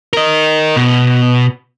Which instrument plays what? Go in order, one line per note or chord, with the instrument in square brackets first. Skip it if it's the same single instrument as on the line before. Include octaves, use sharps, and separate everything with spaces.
[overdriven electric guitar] A#4 D#5
B2